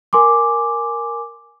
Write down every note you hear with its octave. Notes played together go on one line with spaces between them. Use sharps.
A#4 G#5 C6 D6